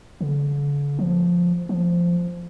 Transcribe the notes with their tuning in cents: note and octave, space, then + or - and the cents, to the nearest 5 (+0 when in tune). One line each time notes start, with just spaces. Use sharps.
D3 -45
F3 +5
F3 -10